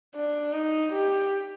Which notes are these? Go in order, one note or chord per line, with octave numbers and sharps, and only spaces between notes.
D4
D#4
G4